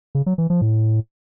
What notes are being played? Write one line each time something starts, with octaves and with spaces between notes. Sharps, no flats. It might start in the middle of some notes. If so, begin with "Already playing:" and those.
C#3
F#3
E3
F3
A2